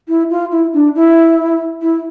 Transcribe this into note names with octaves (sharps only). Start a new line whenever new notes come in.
E4
F4
E4
D4
E4
E4